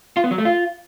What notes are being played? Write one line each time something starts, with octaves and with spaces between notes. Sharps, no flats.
F4
B3
F#3
A3
F4